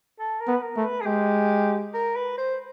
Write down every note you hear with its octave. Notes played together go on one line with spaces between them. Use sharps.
A4
A#4
B3
B4
A#4
A3
B4
G#4
G#3 G4
A#4
B4
C5